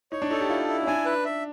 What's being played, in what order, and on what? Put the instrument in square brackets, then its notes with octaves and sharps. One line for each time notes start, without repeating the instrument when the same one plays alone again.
[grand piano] D#4 [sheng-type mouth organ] C#5
[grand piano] D4
[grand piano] D#4 [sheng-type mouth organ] A4
[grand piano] G4
[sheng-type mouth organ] E4 [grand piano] F4
[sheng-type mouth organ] E4
[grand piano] C#4
[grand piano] D4 [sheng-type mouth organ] G#5
[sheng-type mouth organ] B4
E5